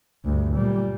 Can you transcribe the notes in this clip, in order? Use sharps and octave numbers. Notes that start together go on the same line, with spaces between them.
D2 G2
A#2 G3